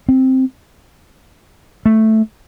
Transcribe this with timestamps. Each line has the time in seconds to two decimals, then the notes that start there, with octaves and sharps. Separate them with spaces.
0.09 C4
1.86 A3